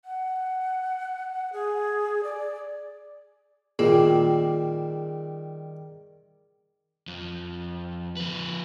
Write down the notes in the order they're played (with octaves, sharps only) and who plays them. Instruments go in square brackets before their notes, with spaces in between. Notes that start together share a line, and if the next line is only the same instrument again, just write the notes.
[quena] F#5
G#4
D5
[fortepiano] A#2 [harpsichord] D#3 G3 [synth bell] G#4
[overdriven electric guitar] F2
F3 B4